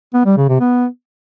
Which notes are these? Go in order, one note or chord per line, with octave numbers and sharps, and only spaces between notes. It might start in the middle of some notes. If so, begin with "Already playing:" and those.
B3
G3
C#3
C3
B3